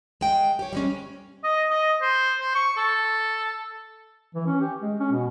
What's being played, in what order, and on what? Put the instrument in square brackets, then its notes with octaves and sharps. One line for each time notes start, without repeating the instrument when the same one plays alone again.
[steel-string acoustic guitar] G#3 G5
G4 C#5
G3 G#3 C#4
[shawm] D#5
D#5
C5
C5
C#6
A4
[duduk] E3
C#4
G4
G#3
C#4
B2